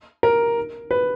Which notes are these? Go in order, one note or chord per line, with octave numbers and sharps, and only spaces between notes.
A#4
B4